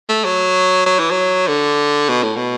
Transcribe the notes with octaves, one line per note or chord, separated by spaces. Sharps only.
A3
F#3
F#3
E3
F#3
D3
B2
A2
B2